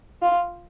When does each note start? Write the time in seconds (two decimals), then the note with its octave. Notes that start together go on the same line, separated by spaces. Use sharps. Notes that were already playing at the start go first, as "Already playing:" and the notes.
0.22 F4